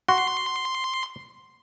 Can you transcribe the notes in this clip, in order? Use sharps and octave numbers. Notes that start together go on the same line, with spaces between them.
F#4 C6